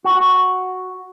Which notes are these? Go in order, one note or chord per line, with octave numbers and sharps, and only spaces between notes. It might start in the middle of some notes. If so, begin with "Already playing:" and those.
F#4